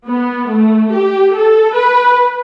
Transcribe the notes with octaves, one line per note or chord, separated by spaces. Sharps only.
B3
A3
G4
A4
B4